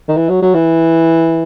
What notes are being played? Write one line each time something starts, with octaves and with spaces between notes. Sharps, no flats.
D#3
E3
F#3
F#3
E3